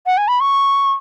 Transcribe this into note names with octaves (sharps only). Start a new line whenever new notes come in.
F#5
G#5
B5
C#6